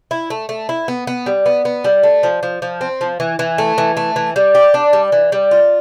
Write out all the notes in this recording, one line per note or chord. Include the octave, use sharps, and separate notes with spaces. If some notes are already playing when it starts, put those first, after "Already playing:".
E4
A3
A3
E4
B3
B3
G3
B3
B3
G3
A3
F3
F3
F3
C4
F3
E3
E3
A3
E3
A3
E3
G3
G4
D4
G3
E3
G3
F4